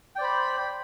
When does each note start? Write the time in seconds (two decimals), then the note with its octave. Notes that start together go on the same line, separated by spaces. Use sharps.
0.16 G5
0.18 D5
0.21 C5
0.24 B5